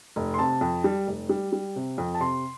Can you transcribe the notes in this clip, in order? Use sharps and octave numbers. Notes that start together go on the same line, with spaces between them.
F1
C6
C3 A5
F2
G3
F1
G3
G3
C3
F2
A5
C3 C6